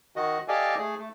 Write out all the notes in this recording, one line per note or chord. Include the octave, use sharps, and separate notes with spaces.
D#3 F#4 D#5
G4 A4 D5 D#5 F5 G#5
A3 G#4
A3